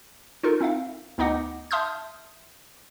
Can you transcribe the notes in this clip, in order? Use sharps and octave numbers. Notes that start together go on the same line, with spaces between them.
D#4 F4 A4 A#4
C4 D#4 E5 F5
D2 B3 D#4 D#5 F#5 D6
E5 A5 C6 D#6 F6 G6